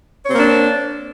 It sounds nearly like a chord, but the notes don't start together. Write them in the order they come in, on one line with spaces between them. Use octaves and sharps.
C#5 C4 A#3 D4